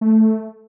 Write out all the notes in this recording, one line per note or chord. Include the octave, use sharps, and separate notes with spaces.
A3